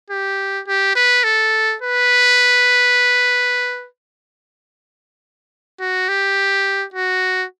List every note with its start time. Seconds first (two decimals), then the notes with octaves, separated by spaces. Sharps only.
0.10 G4
0.67 G4
0.96 B4
1.24 A4
1.82 B4
5.80 F#4
6.09 G4
6.94 F#4